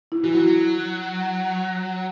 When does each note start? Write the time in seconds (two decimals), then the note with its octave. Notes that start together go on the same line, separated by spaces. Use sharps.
0.12 E4
0.24 E3 F#4
0.33 F#3 E4